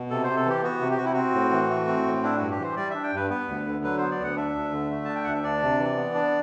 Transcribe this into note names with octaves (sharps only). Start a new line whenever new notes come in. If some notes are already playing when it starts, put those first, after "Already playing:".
Already playing: B2
C3 A4
C3 C5
A4
E3 G4
B3 F#4
C3
G4
C3 F#4
E4
C4 F#4
A2
E3
A3
C4
A2
D4 E4
G2 F#4
G4
E3 C5
G3 D5
D4 E5
G5
G2 B4
B3 B4
D2
D3
F#3 B4
B3 C5
D5
D2 F#5
D4 E5
D2
D3
A3
D4 A5
G5
D2 F#5
E5
D4 D5
C3
E3
B3
D4